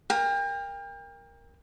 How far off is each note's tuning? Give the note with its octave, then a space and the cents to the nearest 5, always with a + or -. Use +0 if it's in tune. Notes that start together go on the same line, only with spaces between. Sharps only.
A#4 +0 G5 +35